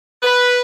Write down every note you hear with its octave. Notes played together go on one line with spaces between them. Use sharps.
B4